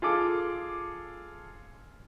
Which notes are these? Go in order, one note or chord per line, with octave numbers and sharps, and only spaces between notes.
F4 G#4 A4 D6